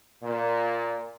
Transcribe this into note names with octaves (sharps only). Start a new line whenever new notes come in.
A#2